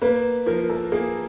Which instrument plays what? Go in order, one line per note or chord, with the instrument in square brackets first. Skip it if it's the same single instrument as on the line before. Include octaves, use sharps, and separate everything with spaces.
[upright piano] A#3 [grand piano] B4
[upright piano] F3 [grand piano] A#4
[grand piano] A4
[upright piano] A#3 [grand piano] G#4